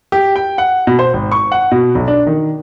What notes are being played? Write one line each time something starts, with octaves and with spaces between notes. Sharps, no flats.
G4
G5
F#5
B2
C5
G#1
C#6
F#5
B2
B1
D4
D#3